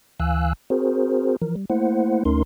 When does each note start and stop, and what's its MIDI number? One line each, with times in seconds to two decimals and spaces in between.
0.20 0.53 38
0.20 0.53 52
0.20 0.53 77
0.20 0.53 80
0.20 0.53 88
0.20 0.53 90
0.70 1.36 60
0.70 1.36 66
0.70 1.36 68
0.70 1.36 70
0.70 1.36 72
1.42 1.55 52
1.42 1.55 53
1.42 1.55 70
1.56 1.65 55
1.70 2.23 57
1.70 2.23 58
1.70 2.23 64
1.70 2.23 72
1.70 2.23 78
2.25 2.43 38
2.25 2.43 57
2.25 2.43 61
2.25 2.43 63
2.25 2.43 70
2.25 2.43 84